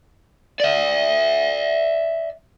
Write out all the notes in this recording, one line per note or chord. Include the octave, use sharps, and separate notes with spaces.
D5 E5